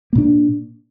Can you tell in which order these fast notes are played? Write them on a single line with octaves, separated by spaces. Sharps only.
A#3 A#2 D4